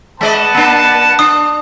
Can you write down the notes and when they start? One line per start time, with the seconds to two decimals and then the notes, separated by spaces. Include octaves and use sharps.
0.21 G#3 B4 D5 D#5 F#5 A5
0.54 A#3 D4
1.19 D4 D#6